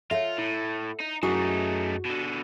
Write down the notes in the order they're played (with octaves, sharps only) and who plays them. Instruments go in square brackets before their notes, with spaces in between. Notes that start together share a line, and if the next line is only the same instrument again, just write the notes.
[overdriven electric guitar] F4 [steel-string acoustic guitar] A4 F#5 [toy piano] C#5 E5
[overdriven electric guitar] A2 [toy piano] E4
[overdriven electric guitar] D#4
[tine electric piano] F#2 G#4 [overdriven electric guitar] A3 D#4 [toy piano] E4 C#6 D6 [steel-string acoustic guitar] F#4
[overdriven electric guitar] B2 D3